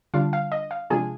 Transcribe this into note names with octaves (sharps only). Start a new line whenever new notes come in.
D3 G3 D4 F4 F5
F5
D#5
F5
C3 F3 G#3 D4 F4 G#4 G#5